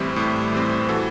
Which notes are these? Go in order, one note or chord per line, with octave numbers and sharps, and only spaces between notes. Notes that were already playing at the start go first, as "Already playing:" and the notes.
Already playing: A2 E3 G3 C4 E4 G4
A2
E3 G3 C4
E3 F#4 A4